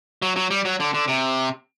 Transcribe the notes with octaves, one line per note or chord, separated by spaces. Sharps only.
F#3
F#3
G3
F#3
D3
D3
C3